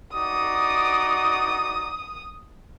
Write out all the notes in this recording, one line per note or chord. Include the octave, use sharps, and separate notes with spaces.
D#4 F#4 D5 D#6